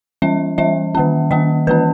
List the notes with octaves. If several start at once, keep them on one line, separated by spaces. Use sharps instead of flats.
E3 G3 C#4 E5
E3 G3 C#4 E5
D#3 A#3 C#4
D#3 A#3 C#4 D#5
E3 A#3 C#4 B4